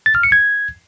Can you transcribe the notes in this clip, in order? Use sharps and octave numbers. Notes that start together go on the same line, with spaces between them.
A6
F6
C#7
G#6